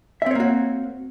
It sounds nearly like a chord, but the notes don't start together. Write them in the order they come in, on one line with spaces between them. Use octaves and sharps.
E5 C4 C#5 A#3 F#4